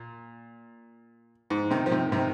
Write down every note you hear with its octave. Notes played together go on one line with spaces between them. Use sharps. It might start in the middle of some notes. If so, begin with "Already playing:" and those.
Already playing: A#2
G#2
C3 D#3
F3
C3 D#3
C3 D#3